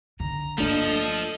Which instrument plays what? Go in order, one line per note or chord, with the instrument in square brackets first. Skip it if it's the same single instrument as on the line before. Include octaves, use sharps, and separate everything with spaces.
[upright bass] D3 [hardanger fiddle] A#5
[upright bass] G1 A#3 [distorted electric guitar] F3 [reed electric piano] A3 D4 [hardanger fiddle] A4 D#5